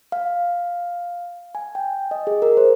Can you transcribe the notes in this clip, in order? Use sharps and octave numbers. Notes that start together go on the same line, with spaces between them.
F5
G#5
G5
D#5
G#4
A#4
C5